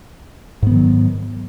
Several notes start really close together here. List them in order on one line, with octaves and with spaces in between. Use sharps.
G#2 B3 D#3 F#3